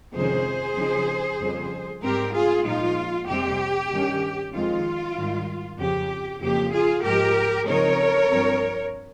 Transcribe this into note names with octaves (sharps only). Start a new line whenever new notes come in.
F2 C3 D#3 G#3 C#4 G#4 C5
C#3 F3 C4 D#4
F2 C#3 G3
G#2 G3 C4 G4 A#4
F4 G#4
A#2 F3 G#3 D#4 F4
F2 C3 G3 C4 G4
G2 D#3 G3 C#4
F2 D#3 G#3 C4 F4
G#2 D#3 G3
F2 C#3 F3 G4
F2 C#3 F3 A#3 G4
F4 G#4
G#2 F3 G#3 G4 A#4
C#3 F3 C4 D#4 A#4 C#5
G2 F3 C4